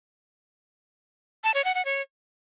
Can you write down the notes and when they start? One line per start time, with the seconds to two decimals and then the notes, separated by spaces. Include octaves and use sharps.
1.44 A5
1.54 C#5
1.64 F#5
1.75 F#5
1.85 C#5